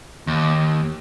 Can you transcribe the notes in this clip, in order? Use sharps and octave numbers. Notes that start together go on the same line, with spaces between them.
D#2